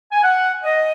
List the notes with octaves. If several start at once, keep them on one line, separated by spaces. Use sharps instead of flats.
G#5
F#5
D#5